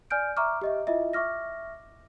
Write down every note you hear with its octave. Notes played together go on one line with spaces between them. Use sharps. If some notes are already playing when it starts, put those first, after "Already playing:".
D5 G#5 F6 G6 D7
E5 A#5 C#6 D6 F6
G4 D#5 E5
E4 F4 D#5 E5
E5 C#6 D6 F6 A#6